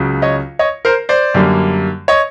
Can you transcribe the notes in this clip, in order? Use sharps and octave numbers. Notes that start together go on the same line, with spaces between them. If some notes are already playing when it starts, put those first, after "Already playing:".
Already playing: C#2 C#3 F#3
C#5 D#5
C#5 D#5
A#4 C5
C5 D5
F#2 D3 G3 A#3
C#5 D#5